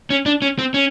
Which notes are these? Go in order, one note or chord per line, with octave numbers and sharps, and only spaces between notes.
C#4
D4
C#4
C4
C#4